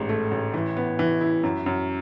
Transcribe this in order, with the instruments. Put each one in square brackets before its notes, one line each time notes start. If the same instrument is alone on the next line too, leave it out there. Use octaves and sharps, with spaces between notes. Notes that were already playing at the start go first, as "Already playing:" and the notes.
Already playing: [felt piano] A1 G#2
A3
A1
E3
B3
E3
E4
F#2
F#2